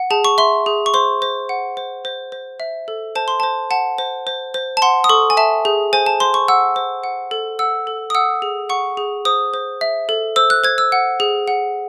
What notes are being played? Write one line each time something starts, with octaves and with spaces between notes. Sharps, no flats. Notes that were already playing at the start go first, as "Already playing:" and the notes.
Already playing: F#5
G#4 A5
C#6
E5 C6
G#4
C#6
C5 C6
C5
F#5
C5
C5
C5
E5
A4
C5 A5
C6
C5 A5
F#5 A5
C5
C5
C5
A5
F#5 C6
D#6
A4 C#6
G#5
E5 A5
G#4
C5 G#5
A5
C5 C6
C#6
F#5 E6
C5
F#5
A4
F#5 E6
A4
D#6
F#5 E6
G#4
F#5 C#6
G#4
C5 D#6
C5
E5
A4
C5 E6
F#6
C5 G#6
E6
F#5
G#4
F#5